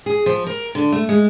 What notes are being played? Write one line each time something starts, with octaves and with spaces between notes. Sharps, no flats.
G#4
F3
A#4
D3
A3
G#3